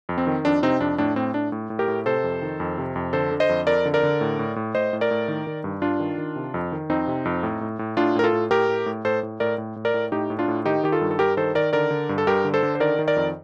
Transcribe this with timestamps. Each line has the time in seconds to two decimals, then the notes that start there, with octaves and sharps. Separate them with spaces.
0.09 F2
0.18 C4
0.27 D#3
0.45 F2 D4
0.63 C3 C4 D#4
0.81 F2 D4
0.98 A2 D4
1.16 A2 C4
1.34 A2 D4
1.52 A2
1.70 A2
1.79 G4 A#4
1.88 A2
2.06 C3 A4 C5
2.24 F2
2.42 D#3
2.60 F2
2.78 C3
2.96 F2
3.13 D3 A4 C5
3.31 D3
3.40 C5 D#5
3.49 F2
3.67 F2 A#4 D5
3.85 D3
3.94 A#4 D5
4.03 D3
4.21 A2
4.39 A2
4.56 A2
4.75 A2 C5 D#5
4.93 A2
5.01 A#4 D5
5.11 A2
5.28 D#3
5.47 D#3
5.64 G2
5.82 G2 D4 F4
6.00 D#3
6.18 D#3
6.36 C3
6.54 F2
6.72 D#3
6.90 F2 C4 D#4
7.07 C3
7.25 F2
7.43 A2
7.61 A2
7.79 A2
7.97 A2 D4 F4
8.15 A2 A#4
8.24 F4 A4
8.33 A2
8.51 A2 G4 A#4
8.68 A2
8.86 A2
9.05 A2 A4 C5
9.23 A2
9.40 A2 A#4 D5
9.58 A2
9.76 A2
9.85 A#4 D5
9.94 A2
10.12 A2 D#4 G4
10.30 A2
10.39 D4 F4
10.48 A2
10.66 D#3 D#4 G4
10.83 D#3 G4
10.92 F4 A4
11.01 G2
11.11 A4
11.19 G2 G4 A#4
11.37 D#3 A4 C5
11.55 D#3 A#4 D5
11.73 D3 A#4 D5
11.91 D3
12.09 G2
12.18 A4
12.27 G2 G4 A#4
12.45 D3
12.54 A4 C5
12.63 D3
12.75 C5
12.80 D#3 A#4 D5
12.99 D#3
13.08 A#4 D5
13.17 F2